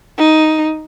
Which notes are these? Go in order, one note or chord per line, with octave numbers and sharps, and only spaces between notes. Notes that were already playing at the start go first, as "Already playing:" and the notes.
D#4